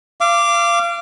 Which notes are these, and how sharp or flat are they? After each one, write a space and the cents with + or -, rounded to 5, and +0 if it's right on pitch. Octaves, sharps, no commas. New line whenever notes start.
F5 -30 D6 +0